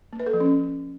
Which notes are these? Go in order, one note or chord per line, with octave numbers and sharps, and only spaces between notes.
A#3
B4
A4
F3
C#4